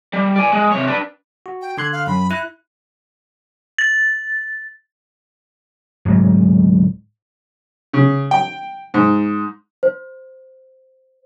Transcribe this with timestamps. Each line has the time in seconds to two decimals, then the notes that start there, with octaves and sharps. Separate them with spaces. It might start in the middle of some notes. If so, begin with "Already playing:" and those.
0.13 G3
0.36 D5 G#5
0.53 G#3
0.72 C3 C#5
0.87 D4 B4
1.46 F#4
1.62 G5
1.77 D3 C6 F#6 G#6
1.92 F5
2.07 F#2 B5
2.31 E4 F#6
3.78 A6
6.05 D1 G#2 F#3
7.93 C#3
8.31 G5
8.94 G#2
9.83 C5